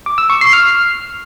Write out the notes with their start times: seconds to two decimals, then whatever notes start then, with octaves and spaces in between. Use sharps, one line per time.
0.06 D6
0.18 E6
0.30 C#6
0.41 C7
0.53 F6